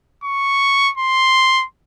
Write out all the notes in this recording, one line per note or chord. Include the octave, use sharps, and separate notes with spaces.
C#6
C6